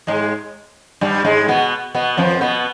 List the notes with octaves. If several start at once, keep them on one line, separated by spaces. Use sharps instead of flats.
G#2 G#3
G2 G3
G#2 G#3
B2 B3
B2 B3
F2 F3
B2 B3